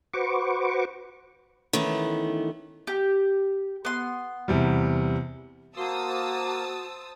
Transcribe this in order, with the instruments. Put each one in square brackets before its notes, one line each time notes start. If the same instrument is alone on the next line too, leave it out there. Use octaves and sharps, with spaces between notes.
[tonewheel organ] F#4 B4 C5 C#6 D6
[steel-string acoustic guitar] D#3 E3 A3 B3 C#4
[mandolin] G4
B3 C6
[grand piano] E2 C3 G3
[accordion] A#3 [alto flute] F#4 [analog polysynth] C5 [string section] A5 D#6 E6